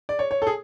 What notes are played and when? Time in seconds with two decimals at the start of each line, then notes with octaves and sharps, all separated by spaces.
0.09 D5
0.19 C#5
0.31 C#5
0.42 A4
0.47 G#4